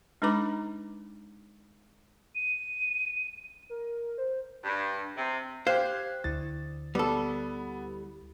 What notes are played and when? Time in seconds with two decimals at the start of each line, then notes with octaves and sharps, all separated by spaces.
0.22 G#3 D4 D#4 B4 B5 D6
2.35 D#7
3.70 A#4
4.18 C5
4.65 G2
5.17 C3
5.67 G4 C5 F5 F#6 G#6
6.24 D2 D3 E4 A6
6.95 G3 B3 A4